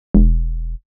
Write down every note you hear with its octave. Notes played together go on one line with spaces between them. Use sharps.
E1